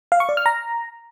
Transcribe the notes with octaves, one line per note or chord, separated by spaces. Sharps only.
F5
C#6
D5
F6
A#5